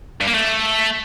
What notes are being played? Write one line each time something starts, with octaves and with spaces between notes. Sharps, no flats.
G2
A#3
A3